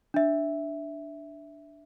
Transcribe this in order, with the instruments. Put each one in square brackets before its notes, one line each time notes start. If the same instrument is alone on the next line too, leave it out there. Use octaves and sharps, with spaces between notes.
[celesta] D4 E5